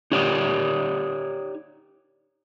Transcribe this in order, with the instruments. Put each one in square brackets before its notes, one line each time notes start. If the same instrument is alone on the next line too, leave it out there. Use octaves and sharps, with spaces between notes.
[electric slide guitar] D#4 G4 C#5 D5